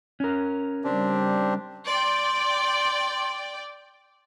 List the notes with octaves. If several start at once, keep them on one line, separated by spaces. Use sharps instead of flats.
C#4 A#4
C#3 G3 C4 D4 G4
D5 G5 C6